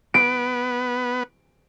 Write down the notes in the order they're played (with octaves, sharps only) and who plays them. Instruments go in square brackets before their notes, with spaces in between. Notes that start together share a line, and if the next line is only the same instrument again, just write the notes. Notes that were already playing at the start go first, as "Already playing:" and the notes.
[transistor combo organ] B3 [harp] D7